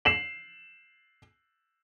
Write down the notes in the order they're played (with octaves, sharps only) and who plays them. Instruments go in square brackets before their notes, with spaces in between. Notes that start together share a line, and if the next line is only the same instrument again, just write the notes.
[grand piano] C7 E7 F#7